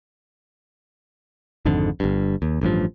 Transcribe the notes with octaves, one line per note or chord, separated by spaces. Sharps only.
G#1 F2 G#2 D3
G1 G2
D#2
A1 G2 F3